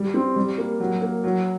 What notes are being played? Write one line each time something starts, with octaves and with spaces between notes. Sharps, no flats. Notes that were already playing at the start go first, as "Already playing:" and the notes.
Already playing: G3
C4
G3
A#3
F#3
A#3
F#3